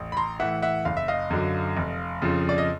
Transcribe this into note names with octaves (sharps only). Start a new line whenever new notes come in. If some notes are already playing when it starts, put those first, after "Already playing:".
Already playing: A1
B5
A#5 C6
A2 E3 E5 F#5
E5 F#5
F#1 F5
E5
D#5 F5
F#2 D3 F#3
F1
F2 C#3 F3
D5
D#5